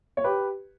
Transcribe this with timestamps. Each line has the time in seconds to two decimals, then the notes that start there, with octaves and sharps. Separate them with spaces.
0.17 C#5
0.24 G4 B4